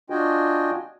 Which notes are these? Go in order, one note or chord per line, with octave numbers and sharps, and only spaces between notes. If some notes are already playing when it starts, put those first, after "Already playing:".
D4 F4 F#4 D#5 G5 G#5